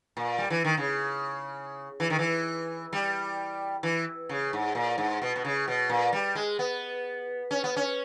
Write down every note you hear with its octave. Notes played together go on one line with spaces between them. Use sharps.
A#2
G3
E3
D#3
C#3
E3
D#3
E3
G3
E3
C#3
G#2
A#2
G#2
B2
B2
C#3
B2
A#2
G3
G#3
B3
C#4
B3
C#4